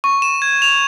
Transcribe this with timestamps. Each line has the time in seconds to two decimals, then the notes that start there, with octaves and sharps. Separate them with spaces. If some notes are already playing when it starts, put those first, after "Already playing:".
0.04 C#6
0.22 E7
0.42 G#6
0.62 F7